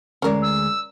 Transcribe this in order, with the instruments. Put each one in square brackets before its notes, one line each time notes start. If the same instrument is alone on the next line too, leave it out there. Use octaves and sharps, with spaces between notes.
[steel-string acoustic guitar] D2 G#3 [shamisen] C#4 A#4 D5
[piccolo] E6